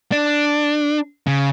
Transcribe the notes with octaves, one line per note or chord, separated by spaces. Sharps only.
D4
C#3